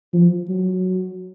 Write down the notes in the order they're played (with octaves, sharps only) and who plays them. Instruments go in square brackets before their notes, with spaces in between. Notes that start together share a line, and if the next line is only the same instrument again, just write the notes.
[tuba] F3
F#3